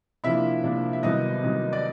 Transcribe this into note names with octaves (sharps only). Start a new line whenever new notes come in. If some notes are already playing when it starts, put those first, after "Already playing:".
C3 F3 A#3 D4 E4 E5
C3 F3 A#3 D4
E5
C2 C3 D#3 F#3 B3 D#4 D#5
C2 C3 D#3 F#3 B3
D5